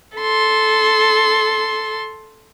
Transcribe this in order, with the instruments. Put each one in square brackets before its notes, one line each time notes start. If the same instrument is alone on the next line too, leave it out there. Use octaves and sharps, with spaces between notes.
[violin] A4 C6